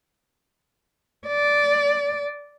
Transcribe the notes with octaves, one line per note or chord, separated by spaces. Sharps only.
D5